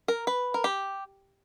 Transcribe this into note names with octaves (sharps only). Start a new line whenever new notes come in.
A#4
B4
A#4
G4